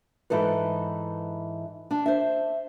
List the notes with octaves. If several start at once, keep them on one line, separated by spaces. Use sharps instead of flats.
G#2 E3 D#4 A4 B4
D4
C5 E5